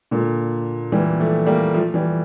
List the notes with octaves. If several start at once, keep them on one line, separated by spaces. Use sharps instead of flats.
A#2 D3
E3 G3
F3 A3
G3 A#3
F3 A3
E3 G3